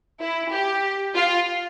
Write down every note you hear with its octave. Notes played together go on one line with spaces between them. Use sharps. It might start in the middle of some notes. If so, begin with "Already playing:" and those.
E4
G4
F4